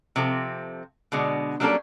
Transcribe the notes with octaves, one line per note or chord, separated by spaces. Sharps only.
C3 F3 C4 A4
B2 D3 G#3
F#3 G3 A#3 C#4 D4 A4